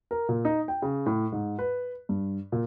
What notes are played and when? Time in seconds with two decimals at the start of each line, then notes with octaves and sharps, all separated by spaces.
0.11 A#4
0.29 A#2
0.45 D#4
0.68 G5
0.82 C#3
1.06 A2
1.32 G#2
1.59 B4
2.09 G2
2.52 A#2